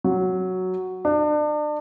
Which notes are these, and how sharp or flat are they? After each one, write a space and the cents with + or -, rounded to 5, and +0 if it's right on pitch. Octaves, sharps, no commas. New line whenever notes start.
F#3 +0
D4 +35